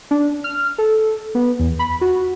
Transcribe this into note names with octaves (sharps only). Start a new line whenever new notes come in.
D4
F6
A4
B3
E2
B5
F#4